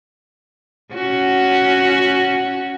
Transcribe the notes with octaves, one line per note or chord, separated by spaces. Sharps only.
C#4 F#4